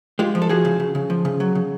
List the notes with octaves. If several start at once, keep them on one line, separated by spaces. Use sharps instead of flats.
G#3 F4 G4
F3
A4
F3 F#4 G#4
C#3
C#3
C#3
F3
C#3
F#3
C#3